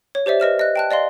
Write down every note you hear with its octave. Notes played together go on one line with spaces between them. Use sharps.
C#5
G4 C5 D5 E5
B4 D#5 F6 E7
D#5 F#6
G5 A5 F#6
D5 D#5 F5 C6